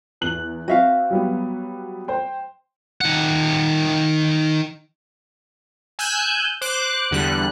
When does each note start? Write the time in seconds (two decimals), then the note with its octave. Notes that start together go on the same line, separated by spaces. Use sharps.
0.21 E2 F#6 F#7
0.68 C4 F#4 E5 F5
1.10 F#3 G3 B3
2.08 C5 G5
3.01 D#3 F#5
5.99 G#5 E6 F#6 G6
6.61 C5 D6 F#6
7.11 E2 D3 G3 F#6